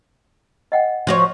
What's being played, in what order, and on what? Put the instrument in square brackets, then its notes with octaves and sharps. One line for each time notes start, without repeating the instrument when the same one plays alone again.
[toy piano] D#5 F#5 G5
[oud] F3 F#4 C#5